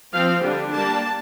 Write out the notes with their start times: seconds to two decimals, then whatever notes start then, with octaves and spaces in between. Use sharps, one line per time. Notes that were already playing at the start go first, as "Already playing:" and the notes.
0.13 F3 C4 F5
0.42 D3 G3 D4
0.71 G3 A#3 D4 A5